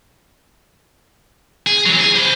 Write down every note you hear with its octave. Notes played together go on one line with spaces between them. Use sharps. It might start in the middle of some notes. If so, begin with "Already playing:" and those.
G#4
E3 F#3
G#4
C5 B5